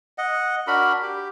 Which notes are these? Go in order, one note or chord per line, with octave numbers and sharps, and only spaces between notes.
D#5 F#5
D4 F#4 A#4 B5
G4